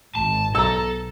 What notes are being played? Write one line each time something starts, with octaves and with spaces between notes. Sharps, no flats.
G#1 G#2 A5
B1 A4 A#5 E6